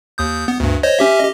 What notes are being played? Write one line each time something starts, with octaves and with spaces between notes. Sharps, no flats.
D#2 D#6 G6
B3
D2 G2
C5 C#5 D#5
C#4 G4 E5
G4 D#5